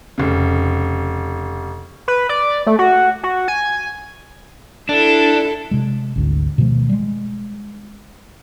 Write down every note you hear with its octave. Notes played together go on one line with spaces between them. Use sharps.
F1 C#3
B4
D5
A3
F#4
F#4
G#5
D4 E4 A4
C3 G#3
G#1 D2
B2 D#3 F3 A3
G3 G#3